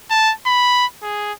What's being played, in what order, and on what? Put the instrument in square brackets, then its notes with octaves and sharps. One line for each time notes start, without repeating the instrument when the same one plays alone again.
[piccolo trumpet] A5
B5
G#4